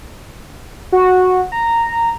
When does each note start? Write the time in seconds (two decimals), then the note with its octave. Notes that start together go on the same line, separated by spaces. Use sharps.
0.92 F#4
1.52 A#5